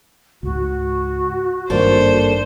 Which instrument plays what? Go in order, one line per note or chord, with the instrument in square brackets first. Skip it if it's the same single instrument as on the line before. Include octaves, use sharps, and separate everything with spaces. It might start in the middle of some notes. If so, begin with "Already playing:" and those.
[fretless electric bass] C#2 G#2 [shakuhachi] F#4
[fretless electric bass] G#1 G2 D#3 [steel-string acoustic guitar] A#3 D4 A4 [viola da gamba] C5